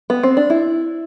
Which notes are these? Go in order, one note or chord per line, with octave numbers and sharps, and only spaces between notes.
B3
C4
D4
E4